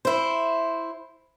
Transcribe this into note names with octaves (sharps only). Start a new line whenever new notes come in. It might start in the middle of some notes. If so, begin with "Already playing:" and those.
E4 C5